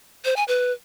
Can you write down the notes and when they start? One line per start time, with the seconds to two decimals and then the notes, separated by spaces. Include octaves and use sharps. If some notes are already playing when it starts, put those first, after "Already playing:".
0.25 C5
0.36 G#5
0.48 B4